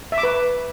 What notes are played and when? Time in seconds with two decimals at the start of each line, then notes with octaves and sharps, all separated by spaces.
0.12 E5
0.18 D6
0.23 B4